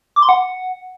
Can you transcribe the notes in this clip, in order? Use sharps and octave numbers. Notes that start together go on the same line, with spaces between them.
D6
C6
F#5